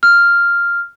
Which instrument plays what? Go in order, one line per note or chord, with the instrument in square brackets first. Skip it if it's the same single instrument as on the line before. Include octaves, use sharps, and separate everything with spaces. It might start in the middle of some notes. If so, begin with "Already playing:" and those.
[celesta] F6